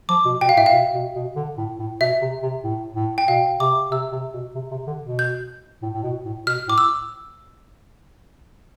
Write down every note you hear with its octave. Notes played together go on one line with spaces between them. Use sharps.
F3 D6
B2
B2 G5
F5
A2 E5
F5
B2
B2
B2
D3
A2
A2
B2 E5
C3
C3
A2
A2
G5
B2 F5
C3 D6
C3 E6
C3
B2
C3
C3
D3
B2
G6
A2
A2
B2
A2
B2 F6
A2 D6
E6